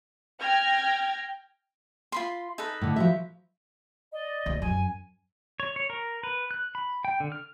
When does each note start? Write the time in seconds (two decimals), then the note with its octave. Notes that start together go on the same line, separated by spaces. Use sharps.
0.40 G5 F6 G#6 A#6
2.12 F4 B5 C6
2.58 D#4 A4 B4
2.81 A2 D3
2.96 F3 F#4 E5
4.12 D5 D#5
4.46 D2
4.62 F#2 G#5
5.60 C#5
5.76 C#5
5.90 A#4
6.23 B4
6.51 F#6
6.75 B5
7.05 G5
7.20 D3
7.32 F6